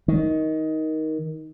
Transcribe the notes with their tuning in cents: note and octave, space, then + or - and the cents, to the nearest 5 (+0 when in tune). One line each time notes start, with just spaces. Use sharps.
D#3 +15